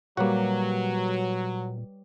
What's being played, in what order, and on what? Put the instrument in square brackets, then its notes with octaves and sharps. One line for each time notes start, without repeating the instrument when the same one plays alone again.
[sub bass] A#2 [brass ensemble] F#3 [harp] G3 B4 C#5 [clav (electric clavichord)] A#3 F#4